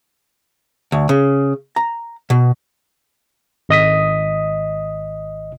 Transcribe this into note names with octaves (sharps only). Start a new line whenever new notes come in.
D2
C#3
A#5
B2
G#1 D#5 D#6 B6